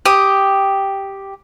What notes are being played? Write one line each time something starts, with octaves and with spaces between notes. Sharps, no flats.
G4 D#6